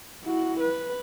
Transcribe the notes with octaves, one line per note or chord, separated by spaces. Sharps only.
E4 F#4
B4